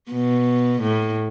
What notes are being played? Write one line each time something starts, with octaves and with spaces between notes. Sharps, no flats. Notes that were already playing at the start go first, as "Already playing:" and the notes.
B2
A2